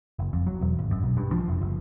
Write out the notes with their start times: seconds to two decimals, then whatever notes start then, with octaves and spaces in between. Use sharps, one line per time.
0.19 F#1
0.33 F2
0.47 F#3
0.61 E1
0.79 G#1
0.91 F#2
1.03 B1
1.17 G2
1.32 F3
1.48 F1
1.62 F#1